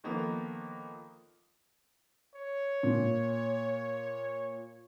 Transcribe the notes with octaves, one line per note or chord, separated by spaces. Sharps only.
D3 D#3 F3 A#3 B3
C#5
A#2